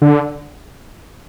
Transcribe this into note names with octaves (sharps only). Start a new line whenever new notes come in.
D3